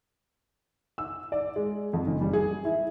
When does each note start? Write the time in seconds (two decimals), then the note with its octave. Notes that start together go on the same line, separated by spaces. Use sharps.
0.98 E6
1.32 D5
1.56 G#3
1.93 F2
2.07 F#1
2.21 G3
2.33 G#4
2.65 E4